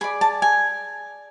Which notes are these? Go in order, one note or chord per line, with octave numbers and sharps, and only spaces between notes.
G#4 D5 B5
A5
G#5